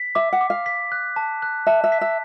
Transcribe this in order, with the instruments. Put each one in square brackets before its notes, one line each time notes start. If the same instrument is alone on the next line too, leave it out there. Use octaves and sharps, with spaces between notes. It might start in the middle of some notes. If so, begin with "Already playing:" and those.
Already playing: [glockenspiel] B6
[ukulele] E5 [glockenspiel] D6
[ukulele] F#5
[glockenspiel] D6
[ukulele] F5
[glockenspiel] B6
F#6
A5
F#6
[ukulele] E5 [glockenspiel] A5
[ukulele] E5
[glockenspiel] B6
[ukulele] E5